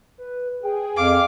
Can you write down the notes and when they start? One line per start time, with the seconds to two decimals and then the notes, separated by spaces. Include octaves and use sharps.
0.18 B4
0.63 G#4 G5
0.97 F2 F5 D6